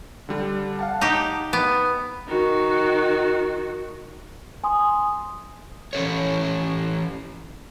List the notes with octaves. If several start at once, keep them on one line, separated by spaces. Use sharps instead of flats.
D3 G3
F5 F#5 A5
D#4 G4
B3
D#3 F#4
G#5 C6 D#6
E3 C#4 A4 C#5